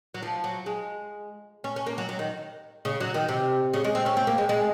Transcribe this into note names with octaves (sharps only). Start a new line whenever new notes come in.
F#3
F3
F#3
G#3
C#4
C#4
A#3
F#3
F#3
D#3
C#3
F#3
D#3
C3
C#3
G#3
C4
C#4
C4
A#3
G#3
G#3